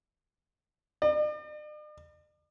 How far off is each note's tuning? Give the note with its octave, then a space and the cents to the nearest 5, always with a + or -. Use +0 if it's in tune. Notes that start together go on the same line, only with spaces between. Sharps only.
D5 +45